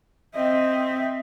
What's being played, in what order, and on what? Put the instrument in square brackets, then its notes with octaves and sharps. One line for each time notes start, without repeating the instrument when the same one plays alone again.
[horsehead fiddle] C4 E5 [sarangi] D#5